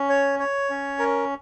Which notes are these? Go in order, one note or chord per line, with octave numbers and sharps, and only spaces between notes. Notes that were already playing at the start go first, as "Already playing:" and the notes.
Already playing: C#4
C#5
C#5
C#4
A#4